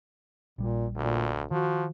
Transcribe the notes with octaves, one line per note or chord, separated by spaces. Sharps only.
A#1 A#2 G3
D2 A#2
D#3 F3 F#4